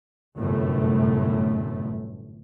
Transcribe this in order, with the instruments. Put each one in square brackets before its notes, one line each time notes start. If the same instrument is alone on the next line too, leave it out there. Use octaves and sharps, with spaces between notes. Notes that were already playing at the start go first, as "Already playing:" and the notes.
[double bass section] G1 F#2 A2 C3 A3